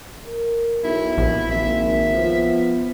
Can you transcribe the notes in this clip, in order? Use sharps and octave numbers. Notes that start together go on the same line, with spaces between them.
A#4
B1 E4
A#1
G#1 A#3 E5
F3 B3